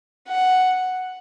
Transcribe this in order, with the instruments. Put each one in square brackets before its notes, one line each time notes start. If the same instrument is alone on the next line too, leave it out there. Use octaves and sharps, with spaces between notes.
[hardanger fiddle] F#5